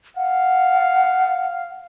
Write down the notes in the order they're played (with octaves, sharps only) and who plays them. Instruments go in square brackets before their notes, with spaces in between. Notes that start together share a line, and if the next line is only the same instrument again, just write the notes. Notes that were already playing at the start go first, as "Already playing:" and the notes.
[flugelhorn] F5 [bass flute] F#5